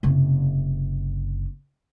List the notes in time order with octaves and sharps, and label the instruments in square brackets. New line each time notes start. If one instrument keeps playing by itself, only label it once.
[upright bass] F#1 C3